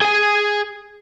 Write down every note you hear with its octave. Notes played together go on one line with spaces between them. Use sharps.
G#4 G#5